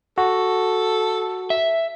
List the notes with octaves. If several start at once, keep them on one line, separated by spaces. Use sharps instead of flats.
F#4 A4
E5